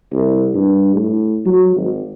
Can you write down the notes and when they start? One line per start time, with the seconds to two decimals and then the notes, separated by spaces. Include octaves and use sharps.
0.12 C2
0.54 G2
0.95 A2
1.46 F#3
1.76 G#1